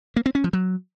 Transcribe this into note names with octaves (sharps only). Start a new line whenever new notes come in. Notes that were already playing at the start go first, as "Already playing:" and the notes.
A#3
C4
C#4
F3
F#3